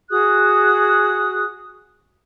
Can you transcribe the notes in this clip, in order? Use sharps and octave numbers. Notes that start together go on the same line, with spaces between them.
F#4 G#4 D#6 F#6